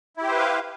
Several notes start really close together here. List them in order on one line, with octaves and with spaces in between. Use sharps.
E4 G4 C5 B4 F5